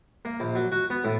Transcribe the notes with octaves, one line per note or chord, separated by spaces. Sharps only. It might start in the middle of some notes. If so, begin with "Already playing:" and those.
A#3
A#1
F#3
F#4
B3
A2